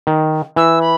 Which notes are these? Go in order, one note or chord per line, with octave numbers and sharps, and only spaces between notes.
D#3
E3 E6
B5